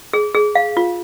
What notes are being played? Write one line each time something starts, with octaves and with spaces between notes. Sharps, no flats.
G#4
G#4
F5
F4